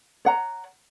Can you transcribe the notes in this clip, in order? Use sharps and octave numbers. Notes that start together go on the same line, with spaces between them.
C#5 F#5 A#5